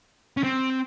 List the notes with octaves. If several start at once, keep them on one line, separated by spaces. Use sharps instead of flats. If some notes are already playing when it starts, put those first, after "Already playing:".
C#4
C4